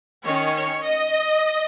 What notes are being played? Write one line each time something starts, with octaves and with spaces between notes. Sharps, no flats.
D#3 C#4 C#5
C#5
D#5